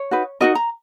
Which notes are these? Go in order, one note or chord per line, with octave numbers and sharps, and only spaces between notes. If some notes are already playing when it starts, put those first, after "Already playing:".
Already playing: C#5
D#4 F#4 B4
D#4 F#4 A#4 D#5
A#5